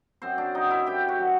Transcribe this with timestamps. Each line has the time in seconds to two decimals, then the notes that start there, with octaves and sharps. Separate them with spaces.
0.22 F#2 C4 C5
0.38 D4 D5
0.55 D#3 F#3 D#4 D#5
0.71 E4 E5
0.86 F#2 G4 G5
1.08 F#4 F#5
1.19 D#3 F#3